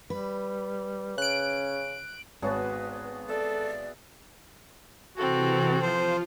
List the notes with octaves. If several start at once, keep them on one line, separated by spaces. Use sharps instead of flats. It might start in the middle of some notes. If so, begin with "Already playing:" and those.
G3 B4
C#3 C#4 F#6 D7
G#1 B3 F#4 G#4 B4 C#5 A5
A4 D5 E5
C3 E3 C4 F#4 A4
F3 F4 C5